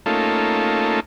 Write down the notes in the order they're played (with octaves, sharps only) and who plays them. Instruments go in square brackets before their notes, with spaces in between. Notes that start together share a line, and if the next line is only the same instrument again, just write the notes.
[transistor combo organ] A3 A#3 C#4 D#4 F4 A4